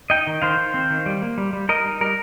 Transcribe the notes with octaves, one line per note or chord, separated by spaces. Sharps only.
D#4 D#5 G5
D#3
D#3 C5 F5
D#3
C4
D#3
G3
A#3
G3
G3
G3 A#4 D#5
D#4
G3 A#4